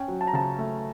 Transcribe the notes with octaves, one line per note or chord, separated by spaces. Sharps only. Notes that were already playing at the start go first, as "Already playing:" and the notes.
Already playing: C#4 G5
F#3
A5
A#5
C#3 A5
A3